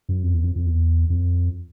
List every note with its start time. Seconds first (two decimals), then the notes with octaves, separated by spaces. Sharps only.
0.09 F#2
0.23 F2
0.34 E2
0.44 F2
0.56 F2
0.66 E2
1.10 F2